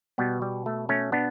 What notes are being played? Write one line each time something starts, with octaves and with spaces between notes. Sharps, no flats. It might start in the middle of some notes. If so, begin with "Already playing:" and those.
B2 G3 B3
G3
A3
A3 C#4
B3 D4